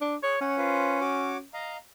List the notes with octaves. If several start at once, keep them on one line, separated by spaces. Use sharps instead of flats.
D4
G#4 C#5 F#6
C#4 C#5 F#5
F4 B4 C5
F#4 C#5 D6
D#5 F5 A#5